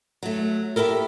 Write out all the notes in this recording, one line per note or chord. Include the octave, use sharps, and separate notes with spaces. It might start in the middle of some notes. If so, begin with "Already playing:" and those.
F#3 A3
E4 G4 A4 A#4